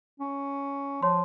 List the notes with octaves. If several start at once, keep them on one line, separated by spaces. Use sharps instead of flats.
C#4
F3 C#5 C6